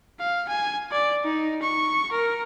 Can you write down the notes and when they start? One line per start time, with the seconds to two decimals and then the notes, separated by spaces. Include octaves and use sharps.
0.20 F5
0.49 G#5
0.92 D5
1.25 D#4
1.62 C#6
2.12 A#4